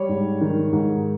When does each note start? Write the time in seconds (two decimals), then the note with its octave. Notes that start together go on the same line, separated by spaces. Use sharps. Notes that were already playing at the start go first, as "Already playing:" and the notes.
Already playing: G3 C#5
0.09 G#2
0.41 D#3
0.72 G#2